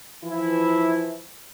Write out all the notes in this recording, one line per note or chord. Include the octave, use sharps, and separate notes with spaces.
E3 F3 E4